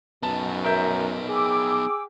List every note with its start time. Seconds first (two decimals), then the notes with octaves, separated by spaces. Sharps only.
0.23 B1 F#2 B3 D#4 A5
0.64 A#4 E5 A#5 G6
1.29 G#4 G5 D6 E6